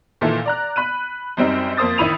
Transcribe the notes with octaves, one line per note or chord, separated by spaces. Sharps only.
A#2 D#3 E3 A4
D5 A#5 F#6
B5 F#6 D#7
F#2 G3 C4 D#4
F2 A#3 C5 D#6 A6
A1 D#3 E4 B5 D#7 F7